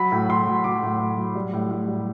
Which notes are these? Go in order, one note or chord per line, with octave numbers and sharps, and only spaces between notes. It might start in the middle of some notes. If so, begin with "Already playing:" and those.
Already playing: F#3 B5
A2
A2 C6
F#3
F#3 D6
A2
A2
F#3
G3
A2
A2
G3